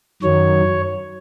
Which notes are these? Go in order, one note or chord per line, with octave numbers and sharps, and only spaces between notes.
F#2 D#3 F#3 C#5